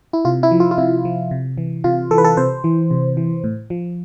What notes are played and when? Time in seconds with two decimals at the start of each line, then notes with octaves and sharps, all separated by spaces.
0.13 E4
0.25 C3 F4
0.43 E4
0.51 F3
0.60 F4
0.71 F4
0.78 C3 E4
1.05 F3
1.31 C3
1.58 E3
1.84 C3 F4
2.11 E3 A4
2.18 B4
2.24 A4
2.37 C3 C5
2.64 E3
2.91 C3
3.17 E3
3.44 A2
3.70 F3